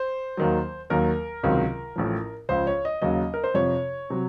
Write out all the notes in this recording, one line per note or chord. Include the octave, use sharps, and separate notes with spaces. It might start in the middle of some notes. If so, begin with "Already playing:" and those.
Already playing: C5
D#2 D#3 F#3
D#2 D#3 F#3 A#4
C#2 C3 D#3 F#3
A1 A2 F3
C#2 C#3 F3 C5
C#5
D#5
D#2 C#3 F#3 D#5
A#4
C5
F2 C3 F3 C#5
C3 F#3